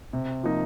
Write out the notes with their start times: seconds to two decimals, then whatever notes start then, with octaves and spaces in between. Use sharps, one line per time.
0.13 C3
0.43 F3 A#3 D#4